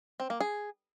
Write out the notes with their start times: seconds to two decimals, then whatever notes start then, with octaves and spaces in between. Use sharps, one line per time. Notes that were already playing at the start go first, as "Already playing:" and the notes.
0.20 C4
0.30 A#3
0.40 G#4